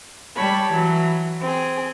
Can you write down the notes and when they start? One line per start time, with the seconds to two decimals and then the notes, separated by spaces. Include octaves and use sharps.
0.36 G3 C#5 A5 B5
0.72 E3 F#3
1.41 C4 G#4